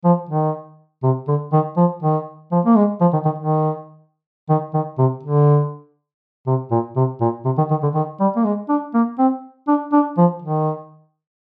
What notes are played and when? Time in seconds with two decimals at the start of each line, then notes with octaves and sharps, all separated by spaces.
0.04 F3
0.29 D#3
1.03 C3
1.28 D3
1.53 D#3
1.77 F3
2.02 D#3
2.52 F3
2.65 A#3
2.76 G#3
3.01 F3
3.13 D#3
3.25 D#3
3.38 D#3
4.49 D#3
4.74 D#3
4.98 C3
5.23 D3
6.47 C3
6.71 A#2
6.96 C3
7.21 A#2
7.45 C3
7.58 D#3
7.70 D#3
7.83 D3
7.94 D#3
8.20 G3
8.36 A#3
8.45 G#3
8.69 D4
8.94 A#3
9.18 C4
9.68 D4
9.93 D4
10.17 F3
10.42 D#3